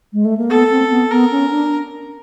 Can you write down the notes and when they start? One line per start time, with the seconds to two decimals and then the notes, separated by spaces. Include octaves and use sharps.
0.13 G#3
0.25 A3
0.37 A#3
0.50 B3 A4
0.71 C4
0.90 B3
1.11 B3 A#4
1.32 C#4
1.51 D4